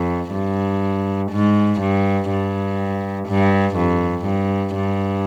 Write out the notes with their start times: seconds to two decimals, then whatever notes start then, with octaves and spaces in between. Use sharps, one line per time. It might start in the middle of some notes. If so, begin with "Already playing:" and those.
Already playing: F2
0.33 G2
1.32 G#2
1.81 G2
2.30 G2
3.28 G2
3.77 F2
4.26 G2
4.75 G2